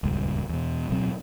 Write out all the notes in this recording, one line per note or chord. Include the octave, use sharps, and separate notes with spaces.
D#1 C#2 G2
E2 B2
D1 B2 F#3 C4